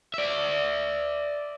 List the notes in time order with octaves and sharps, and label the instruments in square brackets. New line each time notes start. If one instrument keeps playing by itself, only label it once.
[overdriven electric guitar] D5 E5